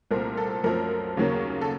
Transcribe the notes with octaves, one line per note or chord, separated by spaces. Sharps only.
C2 A#2 A3 C4 A#4
A4
F#2 F3 A3 C4 A#4
D#2 C#3 F#3 A#3 C#4
A4